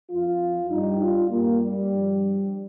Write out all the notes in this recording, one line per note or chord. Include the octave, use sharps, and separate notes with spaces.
F2 F3 F4
G2 G3 D#4
F4
G2 G3 A#3
G3
G2 F3